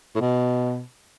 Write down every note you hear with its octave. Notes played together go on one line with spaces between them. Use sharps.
A2
B2